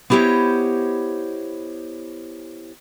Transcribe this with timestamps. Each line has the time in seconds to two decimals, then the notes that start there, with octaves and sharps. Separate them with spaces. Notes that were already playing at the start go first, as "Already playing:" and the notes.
0.10 B3 E4 G4 C5 C#5 D#5